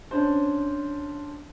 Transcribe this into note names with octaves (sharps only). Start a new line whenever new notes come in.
C#4 D4 C5